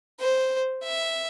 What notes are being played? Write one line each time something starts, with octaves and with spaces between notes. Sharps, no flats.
C5
E5